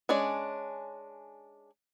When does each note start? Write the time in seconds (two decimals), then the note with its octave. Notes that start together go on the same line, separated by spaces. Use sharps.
0.09 G#3 C#4 D4 D5